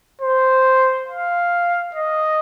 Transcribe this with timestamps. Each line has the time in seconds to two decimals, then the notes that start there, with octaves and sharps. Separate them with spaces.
0.21 C5
1.08 F5
1.95 D#5